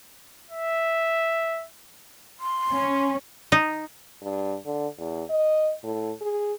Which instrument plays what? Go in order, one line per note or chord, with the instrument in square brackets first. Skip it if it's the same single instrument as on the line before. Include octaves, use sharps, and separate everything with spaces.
[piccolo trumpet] E5
[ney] C6
[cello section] C#4
[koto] D#4
[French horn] G2
D3
E2
D#5
A2
G#4